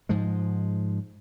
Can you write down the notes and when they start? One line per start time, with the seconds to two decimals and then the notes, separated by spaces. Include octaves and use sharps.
0.09 G#2 F3 G#3